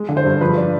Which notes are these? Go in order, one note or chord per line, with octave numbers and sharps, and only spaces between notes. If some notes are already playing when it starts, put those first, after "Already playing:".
Already playing: G#3
D3
C5
G2
F3 B4
D4